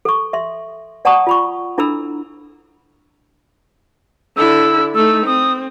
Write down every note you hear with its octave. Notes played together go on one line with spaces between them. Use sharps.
A4 C#6
E5 C6
D5 F#5 A5 A#5 C#6 D#6
F4 B5 C#6
D4 E4 A4 A#5 B5 E6
D3 E4 E6
A3 D#4 E6
C4 D#6